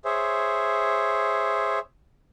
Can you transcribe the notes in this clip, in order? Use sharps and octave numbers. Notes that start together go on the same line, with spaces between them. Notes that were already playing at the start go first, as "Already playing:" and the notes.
G#4 C5 C#5 E5